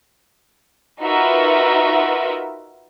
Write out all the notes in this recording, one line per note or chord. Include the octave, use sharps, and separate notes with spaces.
D#4 F4 F#4 A#4 B4 E5